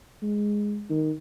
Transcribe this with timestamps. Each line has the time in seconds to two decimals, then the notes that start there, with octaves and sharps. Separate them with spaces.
0.22 G#3
0.90 D#3